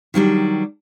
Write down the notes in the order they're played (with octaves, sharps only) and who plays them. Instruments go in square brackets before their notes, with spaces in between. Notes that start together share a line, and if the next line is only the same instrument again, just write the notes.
[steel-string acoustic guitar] D#3 F#3 G3 D4